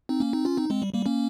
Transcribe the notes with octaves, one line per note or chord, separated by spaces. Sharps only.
C4 D#4
A#3 C#4
C4 D#4
C#4 F4
C4 D#4
G#3 C4
G3
G3 A#3
A#3 C#4